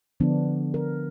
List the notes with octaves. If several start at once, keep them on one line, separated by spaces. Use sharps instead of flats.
D3 F3 B3 D4
A#4